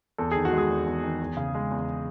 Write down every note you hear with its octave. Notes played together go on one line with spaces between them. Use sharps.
E2 A4
D#3 G#4
F#4
G#3 G#4
E2
E2
D#3
E2
C#3
G#3
E2